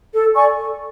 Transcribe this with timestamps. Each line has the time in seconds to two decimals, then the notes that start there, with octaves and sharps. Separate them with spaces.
0.13 A4
0.34 D5 G#5 C#6
0.56 A4